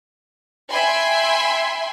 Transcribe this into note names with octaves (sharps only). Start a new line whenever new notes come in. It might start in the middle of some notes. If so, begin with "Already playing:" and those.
E5 G5 G#5 B5 C6